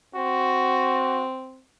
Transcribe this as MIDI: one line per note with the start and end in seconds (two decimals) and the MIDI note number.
0.15 1.62 60
0.15 1.25 66